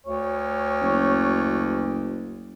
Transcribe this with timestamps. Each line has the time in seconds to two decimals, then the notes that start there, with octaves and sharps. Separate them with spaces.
0.06 D2 C#5
0.81 F#1